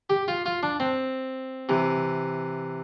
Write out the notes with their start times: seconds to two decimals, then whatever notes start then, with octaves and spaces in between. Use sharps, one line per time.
0.10 G4
0.28 F4
0.46 F4
0.63 D4
0.80 C4
1.69 C3 E3